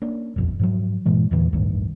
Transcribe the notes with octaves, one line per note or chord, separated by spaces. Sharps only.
A#3 C#4 D4
D#1 B1 F2
G#2 F3 F#3
G2 A#2 E3 G#3
E2 A#2 D3 E3
A1 D2 G2 D#3